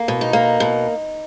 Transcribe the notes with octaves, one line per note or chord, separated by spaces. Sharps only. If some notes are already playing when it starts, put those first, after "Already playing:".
Already playing: A#3
B2
D#4
A#3
B2